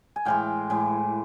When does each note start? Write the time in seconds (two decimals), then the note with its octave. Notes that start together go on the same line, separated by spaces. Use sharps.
0.16 G#5
0.25 A2 E3 G#3 F5 G5
0.70 A2 E3 G#3